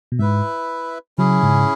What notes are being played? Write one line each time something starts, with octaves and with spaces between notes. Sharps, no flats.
B2
G#2 E4 B4 E5
C#3 F#3 C#4 E4 G#4
G#2 C#3